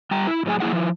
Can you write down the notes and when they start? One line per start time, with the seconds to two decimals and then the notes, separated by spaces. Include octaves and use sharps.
0.11 G3 G5 A#5
0.27 E4
0.46 A2 F#3 F4 G#4 G#5
0.60 F#3 A#3 C#4 E4 G#4 F#5
0.72 F3 E4